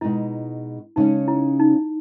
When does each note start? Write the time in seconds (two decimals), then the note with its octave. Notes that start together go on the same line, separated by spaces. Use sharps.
0.01 B2 G#3 D#4 E4
0.96 C#3 G#3 C#4 D#4
1.28 E4
1.60 D#4